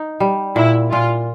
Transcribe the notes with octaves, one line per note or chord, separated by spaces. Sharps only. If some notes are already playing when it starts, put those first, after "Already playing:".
Already playing: D#4
G3
A#2 E4
A#2 F4